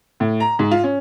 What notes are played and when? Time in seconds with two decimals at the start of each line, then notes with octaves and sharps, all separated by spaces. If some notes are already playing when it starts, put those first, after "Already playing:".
0.20 A2
0.40 A#5
0.59 G#2
0.71 F4
0.84 C#4